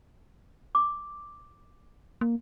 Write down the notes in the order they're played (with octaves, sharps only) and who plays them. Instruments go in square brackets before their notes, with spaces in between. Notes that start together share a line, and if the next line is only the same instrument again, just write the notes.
[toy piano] D6
[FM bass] A#3